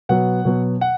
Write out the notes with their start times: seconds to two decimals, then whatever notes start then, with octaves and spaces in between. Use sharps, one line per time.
0.09 B2 F#3 B3 F#5
0.45 B2 F#3 B3
0.81 F#5